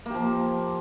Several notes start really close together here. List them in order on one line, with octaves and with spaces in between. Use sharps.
A#3 G4 F3